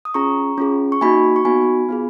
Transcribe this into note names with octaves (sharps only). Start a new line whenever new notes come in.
D#6
C#4 F4 G#4 A#5 C#6
C#4 F4 G#4
C#6
A#3 D#4 F#4 G#5 B5
C#6
B3 D#4 F#4 G#5 B5
B3 F4 G#4